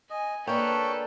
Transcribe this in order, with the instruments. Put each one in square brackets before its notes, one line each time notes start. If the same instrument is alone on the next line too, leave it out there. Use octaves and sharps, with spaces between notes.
[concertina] D#5 [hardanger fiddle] G#5
[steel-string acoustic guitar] A#3 D4 [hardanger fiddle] A4 B4 [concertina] C#5 G5